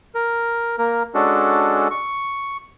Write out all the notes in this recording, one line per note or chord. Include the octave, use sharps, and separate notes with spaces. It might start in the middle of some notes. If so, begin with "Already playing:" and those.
A#4
A#3 A#4
G#3 C#4 D4 F#4 A4
C#6